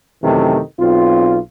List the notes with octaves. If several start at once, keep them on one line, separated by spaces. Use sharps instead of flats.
F#2 C3 D#3 E3 A3
B1 C4 F4